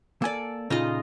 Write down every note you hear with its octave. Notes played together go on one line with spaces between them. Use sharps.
A#3 A4 D5 G#5
A#2 C#3 D#4 F4 D#5